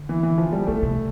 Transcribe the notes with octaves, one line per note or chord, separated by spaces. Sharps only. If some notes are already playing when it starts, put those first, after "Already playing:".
Already playing: D3
E3
E3
F3
G3
D3 A3
C3